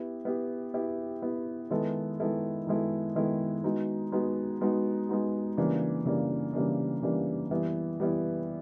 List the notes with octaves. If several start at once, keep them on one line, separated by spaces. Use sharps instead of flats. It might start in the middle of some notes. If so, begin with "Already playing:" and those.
Already playing: B3 E4 G4
B3 E4 G4
B3 E4 G4
B3 E4 G4
D#3 G#3 B3 E4 A4
D#3 G#3 B3 E4 A4
D#3 G#3 B3 E4 A4
D#3 G#3 B3 E4 A4
G#3 B3 D#4 F#4
G#3 B3 D#4 F#4
G#3 B3 D#4 F#4
G#3 B3 D#4 F#4
C#3 E3 G3 A#3 D4
C#3 E3 G3 A#3 D4
C#3 E3 G3 A#3 D4
C#3 E3 G3 A#3 D4
E3 G3 B3 E4
E3 G3 B3 E4